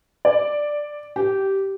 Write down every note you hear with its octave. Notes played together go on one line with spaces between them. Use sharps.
D5
G4